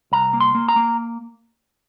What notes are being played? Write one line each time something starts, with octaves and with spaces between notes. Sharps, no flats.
C2 A#5
A#3
C6
A#3
A#5
A#3